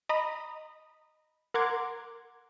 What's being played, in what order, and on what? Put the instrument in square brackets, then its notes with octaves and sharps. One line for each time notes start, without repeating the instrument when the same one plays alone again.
[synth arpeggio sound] D#5 A#5 B5 D#6
A#4 F#5 A#5 C6 D6 G#6